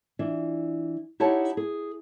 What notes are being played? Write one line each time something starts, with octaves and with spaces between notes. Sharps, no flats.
E3 D4 F4
D#4 E4 G4 C#5 F#5 A5
G#4